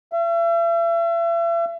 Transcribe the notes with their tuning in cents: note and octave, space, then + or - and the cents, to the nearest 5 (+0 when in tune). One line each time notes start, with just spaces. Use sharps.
E5 +40